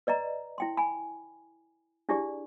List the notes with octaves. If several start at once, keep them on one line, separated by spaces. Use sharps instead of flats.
B4 D5 D#5 A#5
E4 G5 C6
G#5 B5
D4 E4 G4 G#4 D5